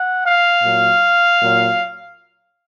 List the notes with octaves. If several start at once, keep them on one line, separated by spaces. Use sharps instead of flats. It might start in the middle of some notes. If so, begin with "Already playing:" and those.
Already playing: F#5
F5
A#2 F#3
A#2 F#3